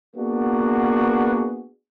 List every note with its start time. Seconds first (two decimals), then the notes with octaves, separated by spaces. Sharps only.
0.16 A#3 B3 D4 F#4 G#4